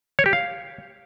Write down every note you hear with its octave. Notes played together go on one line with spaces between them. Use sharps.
C#5
G4
F5